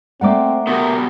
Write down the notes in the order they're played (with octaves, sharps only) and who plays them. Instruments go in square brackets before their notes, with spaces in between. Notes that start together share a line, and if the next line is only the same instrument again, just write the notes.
[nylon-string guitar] A3 A#3 D5 [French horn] C4 [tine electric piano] F#5 A#5 D6
[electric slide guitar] B3 F#4 G4 [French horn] A#4